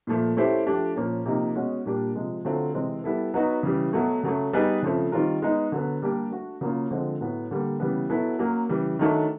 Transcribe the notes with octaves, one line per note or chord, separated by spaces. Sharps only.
A#2 F3 A3
A3 C#4 E4 G4 C5
F3 A3 D4 G4
A#2 F3 A#3 C#4
C3 F3 A#3 D#4 G4
B2 G#3 C#4 F#4
A#2 G3 A#3 D4 G4
C3 F3 G#3
D3 F#3 A3 C4 F4
C3 E3 G#3 C4
G3 B3 E4 A4
F#3 B3 D#4 F#4 B4
C#3 E3 G3
B2 F#3 A3
C#3 F#3 A3
G3 B3 D#4 G#4 B4
C#3 F3 A3 C4
D#3 G3 C4 F4 A#4
G#3 B3 D#4
D3 F#3 B3
G3 A#3 D4 G4
A3 D4 F#4 A4
C#3 F#3 A#3 C#4 F4
D3 F3 G#3 C4
A2 F#3 B3
D3 G3 A#3
C#3 E3 G3 B3
B2 F#3 B3 E4 A4
F#3 A#3 C#4
C#3 E3 G3
D#3 F#3 A3 D4